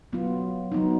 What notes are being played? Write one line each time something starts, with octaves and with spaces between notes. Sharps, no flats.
F#3 B3 F4
F#3 B3 D#4